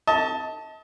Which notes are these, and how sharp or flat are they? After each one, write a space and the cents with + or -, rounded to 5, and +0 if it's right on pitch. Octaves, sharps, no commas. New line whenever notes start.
D#5 +40 A5 +0